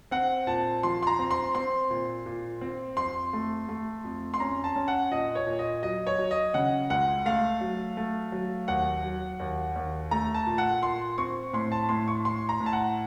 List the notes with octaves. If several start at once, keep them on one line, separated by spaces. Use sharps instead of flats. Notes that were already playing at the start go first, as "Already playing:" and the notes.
C4 F#5
A#2 A5
F3 C6
C6
A#5
C4
C6
C4 C6
A#2
A#2
C4
F2 C6
A3
A3
F2
C6
C#4 A#5
A5
C#4
F#5
A#2 D#5
C#5
A#2
D#5
F#3 D#5
C#5
F#3
D#5
C#3 F#5
C#2 F#5
A3 F5
F#3
A3
F#3
D#2 F#5
F#3
D#2
D#2
A3 A#5
A5
A#2
F#5
A#2 C6
C4 C#6
A2 C6
A5
A2 C6
C#6
A2 C6
A#5
A2
A5
F#5